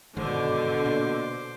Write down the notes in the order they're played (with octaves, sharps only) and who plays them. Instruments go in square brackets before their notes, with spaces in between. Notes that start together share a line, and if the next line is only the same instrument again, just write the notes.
[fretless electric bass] G1 G#2 D#3 [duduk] B2 [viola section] D3 [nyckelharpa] C5 D6
[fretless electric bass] A#2